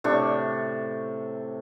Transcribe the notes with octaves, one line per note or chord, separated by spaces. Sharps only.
A2 C3 D4 C#6